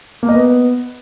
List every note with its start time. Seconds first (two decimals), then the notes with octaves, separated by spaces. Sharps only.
0.23 A#3
0.29 D#5
0.34 B3